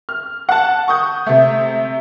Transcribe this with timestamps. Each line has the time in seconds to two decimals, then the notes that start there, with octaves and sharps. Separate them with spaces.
0.09 F6
0.49 F#5 A5
0.88 C#6 D#6 G6
1.26 C3 A3